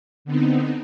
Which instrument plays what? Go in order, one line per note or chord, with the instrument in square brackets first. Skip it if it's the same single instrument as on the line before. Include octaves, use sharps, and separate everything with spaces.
[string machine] D3 B3 C4 D#4